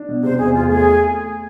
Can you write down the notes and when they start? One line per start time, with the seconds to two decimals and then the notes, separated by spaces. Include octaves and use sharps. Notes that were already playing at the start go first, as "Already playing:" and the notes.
Already playing: D4
0.09 B2
0.23 C3 C5
0.38 E2 G#4
0.53 E2 F4
0.68 A3 G#4